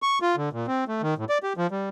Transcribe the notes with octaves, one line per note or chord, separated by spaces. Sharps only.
C#6
F4
D3
A#2
C4
A3
D#3
A2
D5
G4
F3
G3